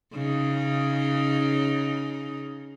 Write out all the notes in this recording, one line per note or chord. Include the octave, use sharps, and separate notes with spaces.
C#3 D#4